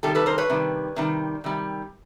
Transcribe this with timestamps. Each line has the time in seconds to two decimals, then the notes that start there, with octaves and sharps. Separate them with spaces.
0.03 C3 D#3 G3 G4 A4
0.15 A4 B4
0.26 A#4 C5
0.38 B4 C#5
0.50 C3 D#3 G3
0.96 C3 D#3 G3
1.44 C3 D#3 G3